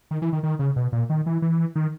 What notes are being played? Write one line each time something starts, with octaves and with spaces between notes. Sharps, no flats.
D#3
E3
D#3
D#3
C#3
B2
A#2
D#3
E3
E3
D#3